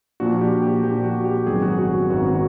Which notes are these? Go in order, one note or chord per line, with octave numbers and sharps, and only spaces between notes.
A#2 F3 A#3 D4 F#4
G4
G4
A#2 F3 A#3 D4 G4
F#4
G4
G#1 F#2 D#3 F#3 B3 G#4
F#4
F#4
G#1 F#2 D#3 F#3 B3 F#4
F#4